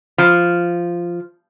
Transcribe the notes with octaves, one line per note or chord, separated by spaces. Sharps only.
F3